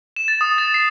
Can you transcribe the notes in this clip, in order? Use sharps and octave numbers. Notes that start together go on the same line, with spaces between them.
E7
A6
D#6
A6
C7